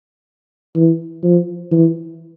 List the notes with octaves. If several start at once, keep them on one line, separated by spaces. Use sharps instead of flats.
E3
F3
E3